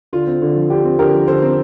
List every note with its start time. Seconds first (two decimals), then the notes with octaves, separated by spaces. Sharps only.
0.13 D3 F4
0.27 C4
0.42 D3
0.56 F3
0.70 D3 G4
0.85 C4
0.99 D3 G4 A#4
1.14 F3
1.28 D3 A4 C5
1.42 C4